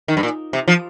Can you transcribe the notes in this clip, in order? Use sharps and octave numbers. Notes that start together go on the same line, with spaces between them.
D#3
G2
A#2
C3
F3